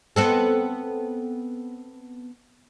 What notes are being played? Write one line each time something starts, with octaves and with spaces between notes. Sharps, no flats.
B3 C4 A4